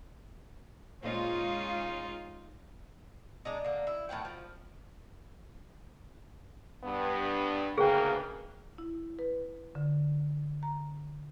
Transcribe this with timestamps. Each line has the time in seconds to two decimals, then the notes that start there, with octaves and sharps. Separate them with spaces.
1.03 A#2 G#3 C#4 D#4 F4 C5 D#5
3.45 G#3 D4 D#4
3.64 D3 A#3
3.87 E4
4.09 A2 D#3 F#5 G5
4.25 F3
6.83 G2 B3
7.78 D2 G#2 C#3 A#3 G#4 A#4 B4 G5
8.78 E4
9.19 B4
9.75 D3
10.63 A#5